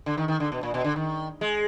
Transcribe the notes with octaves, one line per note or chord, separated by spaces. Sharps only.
D3
D#3
D#3
D3
B2
A#2
B2
D3
D#3
G#3